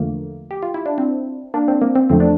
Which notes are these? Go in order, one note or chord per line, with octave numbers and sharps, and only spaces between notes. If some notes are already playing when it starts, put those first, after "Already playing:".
Already playing: E2 D3 F3 A3 A#3
G4
F4
E4
D4
C4
A#3 D4
C4
A#3
C4
E2 D3 F3 A3 C4
D4